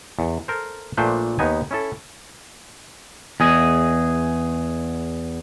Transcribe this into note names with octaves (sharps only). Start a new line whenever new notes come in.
E2
A4 A#4 C5
A#1 A#2 A3 D4 B4 C5
D#2 B3 D#4 G#5
C#4 E4 A4
E2 G#4 D#5